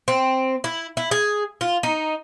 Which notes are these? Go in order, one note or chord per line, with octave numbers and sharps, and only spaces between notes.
C4
E4
E4
G#4
F4
D#4